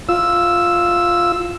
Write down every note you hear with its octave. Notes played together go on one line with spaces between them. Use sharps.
F4 E6